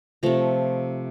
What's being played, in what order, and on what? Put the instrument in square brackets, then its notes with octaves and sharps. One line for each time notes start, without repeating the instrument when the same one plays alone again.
[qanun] C3 F3 A3 A#5